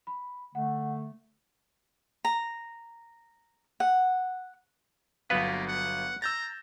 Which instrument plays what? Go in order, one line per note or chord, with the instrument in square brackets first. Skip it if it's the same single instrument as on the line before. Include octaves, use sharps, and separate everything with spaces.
[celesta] B5
[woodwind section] D3 A3 [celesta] F#5
[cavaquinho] A#5
F#5
[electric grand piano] G1 F#3 F5 [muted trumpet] A#3 [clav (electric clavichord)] B3 B4
[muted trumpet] F#5
[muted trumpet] A#5 [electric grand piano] E6 G6 A6